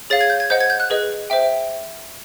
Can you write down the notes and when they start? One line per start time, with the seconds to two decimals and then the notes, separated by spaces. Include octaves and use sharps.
0.10 G#4 C#5 F5 A6
0.21 G#6
0.30 G6
0.40 G#6
0.50 C5 D#5 F#5 G6
0.61 G#6
0.70 G6
0.80 F#6
0.90 G#4 B4 D#5
1.30 C5 E5 G5